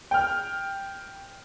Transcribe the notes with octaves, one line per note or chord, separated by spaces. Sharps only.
G5 F6